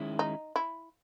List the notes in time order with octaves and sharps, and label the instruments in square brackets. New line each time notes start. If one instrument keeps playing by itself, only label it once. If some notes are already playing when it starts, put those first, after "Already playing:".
Already playing: [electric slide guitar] D#3 G#3 C#4 E4
[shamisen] D#4
E4